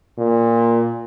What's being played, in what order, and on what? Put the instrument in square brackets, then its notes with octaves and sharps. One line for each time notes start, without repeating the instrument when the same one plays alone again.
[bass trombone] A#2